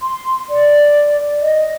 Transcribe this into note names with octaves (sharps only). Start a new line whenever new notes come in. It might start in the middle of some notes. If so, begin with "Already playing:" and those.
C6
D5
D#5